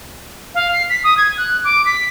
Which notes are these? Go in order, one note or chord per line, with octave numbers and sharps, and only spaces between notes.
F5
C7
B6
D#6
G#6
F#6
D6
B6